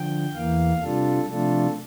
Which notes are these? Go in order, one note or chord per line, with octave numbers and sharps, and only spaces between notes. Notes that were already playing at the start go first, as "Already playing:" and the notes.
Already playing: D3 F3 G5
E2 E3 A#3 F5
C3 G3 D4 F4 A4
C3 F3 A3 D4 F4 A4